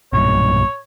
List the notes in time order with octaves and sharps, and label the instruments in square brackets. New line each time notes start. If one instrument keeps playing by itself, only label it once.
[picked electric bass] B1 G2 A#2 [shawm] C#5